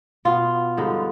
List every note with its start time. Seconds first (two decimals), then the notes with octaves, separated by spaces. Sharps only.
0.25 B2 B3 F4
0.77 G2 D3 F3 G#3 D#4